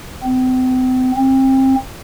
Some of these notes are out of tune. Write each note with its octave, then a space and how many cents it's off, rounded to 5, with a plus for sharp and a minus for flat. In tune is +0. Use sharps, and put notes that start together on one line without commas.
C4 -40
C4 +25